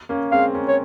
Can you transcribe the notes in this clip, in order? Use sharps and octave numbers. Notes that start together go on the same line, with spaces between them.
A#3 C#4
G#3 C4 F5
A#3 C#4
C#5